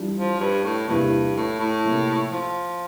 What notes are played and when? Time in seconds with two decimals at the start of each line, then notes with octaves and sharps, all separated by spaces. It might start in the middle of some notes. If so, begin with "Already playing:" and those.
Already playing: E3 G3 D4 F4
0.16 F3
0.39 G2
0.64 A2
0.88 E2 G2 C3 F3 A#3 E4
1.36 A2
1.59 A2
1.84 C3 F3 A#3 E4
2.31 F3